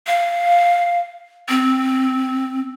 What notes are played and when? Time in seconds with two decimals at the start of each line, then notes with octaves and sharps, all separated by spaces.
0.07 F5
1.49 C4